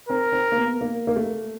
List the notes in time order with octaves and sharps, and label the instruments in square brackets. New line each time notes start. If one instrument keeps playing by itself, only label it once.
[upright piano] C4 [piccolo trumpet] A#4
[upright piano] C4
A#3
B3
A#3
A#3
A3